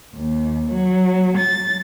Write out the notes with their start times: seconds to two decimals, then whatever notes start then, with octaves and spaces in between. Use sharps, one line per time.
0.14 D#2
0.70 F#3
1.38 A6